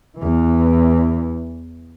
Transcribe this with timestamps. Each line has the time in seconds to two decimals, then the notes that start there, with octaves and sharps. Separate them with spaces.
0.18 E2 E3